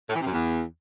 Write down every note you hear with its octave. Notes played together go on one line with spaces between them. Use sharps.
A2
E3
C3
F#2
E2